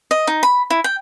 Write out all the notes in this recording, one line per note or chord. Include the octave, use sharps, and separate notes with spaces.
D#5
D#4
B5
E4
G5